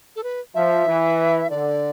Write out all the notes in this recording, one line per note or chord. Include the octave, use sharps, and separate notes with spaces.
A4
B4
F3 E5
E3
D3 D5